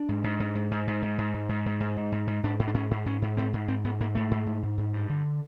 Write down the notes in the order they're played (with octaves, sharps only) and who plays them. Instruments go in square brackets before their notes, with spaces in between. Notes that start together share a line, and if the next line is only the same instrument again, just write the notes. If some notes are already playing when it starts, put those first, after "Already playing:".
Already playing: [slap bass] D4
G#2
G#2
G#2
G#2
G#2
G#2
G#2
G#2
G#2
G#2
G#2
G#2
G#2
G#2
G#2
G#2 D4
G#2
D4
G#2 C#4
G#2
G#2 C#4
G#2
G#2 C4
G#2
G#2 C4
G#2 B3
G#2 A#3
G#2 A3
G#2
G#2
G#2
G#2
G2
D3